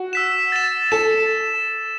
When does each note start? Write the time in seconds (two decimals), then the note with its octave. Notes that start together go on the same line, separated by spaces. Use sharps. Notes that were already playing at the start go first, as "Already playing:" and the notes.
Already playing: F#4
0.13 E6 B6 E7
0.52 A6 E7
0.92 A4 A6 E7